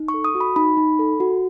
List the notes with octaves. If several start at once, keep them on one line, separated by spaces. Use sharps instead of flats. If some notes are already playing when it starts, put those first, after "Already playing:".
Already playing: D#4
C#6
A4
D#6
F#4
B5
D#4 B5
D#4
A4
F#4